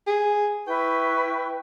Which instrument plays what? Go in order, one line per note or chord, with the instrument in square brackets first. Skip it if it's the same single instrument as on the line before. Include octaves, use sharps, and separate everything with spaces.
[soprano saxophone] G#4
[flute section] E4 B4 C#6 [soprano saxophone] G5